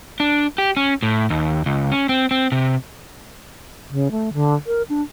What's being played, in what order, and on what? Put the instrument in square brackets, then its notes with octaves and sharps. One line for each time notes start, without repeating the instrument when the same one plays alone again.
[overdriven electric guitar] D4
G4
C#4
A2
D#2
C#2
C#4
C4
C4
C3
[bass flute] C#3
A3
D3
A#4
D4